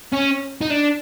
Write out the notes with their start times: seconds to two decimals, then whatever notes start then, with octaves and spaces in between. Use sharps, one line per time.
0.12 C#4
0.61 D#4
0.70 D4